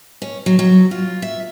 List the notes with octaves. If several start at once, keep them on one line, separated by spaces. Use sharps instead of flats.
C#4
F#3
F#3
F4
E5